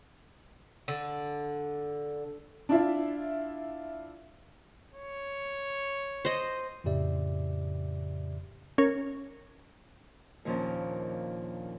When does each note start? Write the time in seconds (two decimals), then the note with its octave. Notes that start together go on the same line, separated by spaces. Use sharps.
0.88 D3
2.69 D4 E4 F4 E5
4.94 C#5
6.25 C5 D#5
6.84 F2 A2 C#3 G4 D5 E5
8.78 C#4 A#4 C#5
10.45 D#2 A#2 F3 C#4 D4